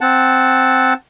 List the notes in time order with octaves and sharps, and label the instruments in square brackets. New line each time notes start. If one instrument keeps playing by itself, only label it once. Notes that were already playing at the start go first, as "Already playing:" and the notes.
[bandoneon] C4 F#5 A5